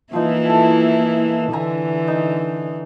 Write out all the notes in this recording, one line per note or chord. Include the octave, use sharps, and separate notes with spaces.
E3 F3 A#3 D#4 E4
A4 A5
D3 E3 E5 G#5 A#5
D#4